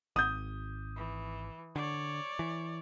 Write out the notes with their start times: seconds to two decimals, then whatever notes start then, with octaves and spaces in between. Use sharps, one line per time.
0.16 G#1 D#6 G6
0.96 E3
1.76 D3 C#5 D5
2.39 E3